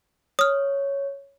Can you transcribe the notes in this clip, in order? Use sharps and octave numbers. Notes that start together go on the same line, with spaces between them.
C#5 D#6 F6